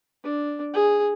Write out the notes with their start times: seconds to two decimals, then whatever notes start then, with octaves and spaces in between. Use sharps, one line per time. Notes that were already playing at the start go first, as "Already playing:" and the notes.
0.24 D4
0.74 G#4